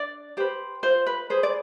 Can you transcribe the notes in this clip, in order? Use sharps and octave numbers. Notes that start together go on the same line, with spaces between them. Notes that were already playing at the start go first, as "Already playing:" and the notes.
Already playing: D4 D5
G4 B4 C5
F4 C5
B4
G#4 B4 C5
D5